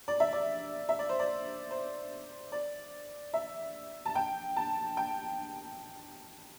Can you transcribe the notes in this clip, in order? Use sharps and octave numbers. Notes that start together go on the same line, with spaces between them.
D5
E5
D5
E5
D5
C5
D5
C5
D5
E5
A5
G5
A5
G5